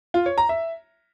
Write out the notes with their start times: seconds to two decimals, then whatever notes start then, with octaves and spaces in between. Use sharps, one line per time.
0.14 F4
0.26 C#5
0.38 A#5
0.49 E5